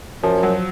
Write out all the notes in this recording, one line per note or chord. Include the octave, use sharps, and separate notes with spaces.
F#2 F3
F#3